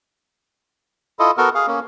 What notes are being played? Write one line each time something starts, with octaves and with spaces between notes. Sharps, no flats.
E4 F4 A4 D#5
B3 F#4 A4 A#4
G#4 F5
A#3 C#4